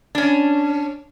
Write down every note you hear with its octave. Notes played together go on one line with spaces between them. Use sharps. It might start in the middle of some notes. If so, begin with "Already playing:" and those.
C#4 D4